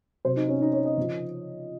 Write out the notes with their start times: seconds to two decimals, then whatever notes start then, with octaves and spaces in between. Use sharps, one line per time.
0.25 C3 F#3 C5
0.37 D#4
0.49 C#4
0.61 D#4
0.73 C#5
0.85 D#5
0.97 C#3 F3